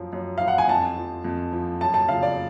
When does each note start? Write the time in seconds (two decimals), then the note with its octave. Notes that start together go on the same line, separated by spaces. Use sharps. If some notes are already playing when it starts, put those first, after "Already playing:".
Already playing: F#2 F3
0.13 F#2
0.38 F3 F5
0.48 F#5
0.58 G#5
0.68 F2 A5
0.97 F3
1.24 F2
1.52 F3
1.81 F#2 A5
1.94 A5
2.08 C#3 F3 F5
2.23 D5